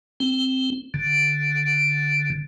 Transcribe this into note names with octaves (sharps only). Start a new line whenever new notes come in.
C4
D3